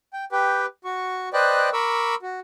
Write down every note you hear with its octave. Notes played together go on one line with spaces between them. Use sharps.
G5
G4 B4 G5
F#4 C#6
B4 C5 D5 D#5 G5 F#6
A#4 B5 C#6 D6 E6
F#4